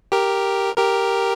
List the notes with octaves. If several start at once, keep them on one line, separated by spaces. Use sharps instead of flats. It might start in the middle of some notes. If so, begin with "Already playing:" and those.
G4 A#4
G4 A#4